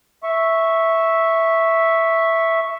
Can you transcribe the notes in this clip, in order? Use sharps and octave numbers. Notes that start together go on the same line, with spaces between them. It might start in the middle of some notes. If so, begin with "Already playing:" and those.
E5 C#6